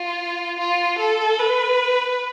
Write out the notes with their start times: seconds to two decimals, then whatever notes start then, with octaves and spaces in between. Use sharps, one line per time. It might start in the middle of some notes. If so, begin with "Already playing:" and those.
Already playing: F4
0.59 F4
0.99 A4
1.39 B4